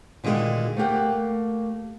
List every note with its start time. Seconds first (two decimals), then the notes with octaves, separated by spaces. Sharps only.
0.24 A#2 D3 D#3 G#3 F4 F#4
0.77 A3 A#3 G4 F#5